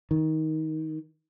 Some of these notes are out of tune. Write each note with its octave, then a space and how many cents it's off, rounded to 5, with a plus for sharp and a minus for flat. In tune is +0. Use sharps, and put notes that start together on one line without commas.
D#3 +20